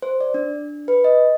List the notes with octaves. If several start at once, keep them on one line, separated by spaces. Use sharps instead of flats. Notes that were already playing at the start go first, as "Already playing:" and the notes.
C5
D5
D4
B4
D#5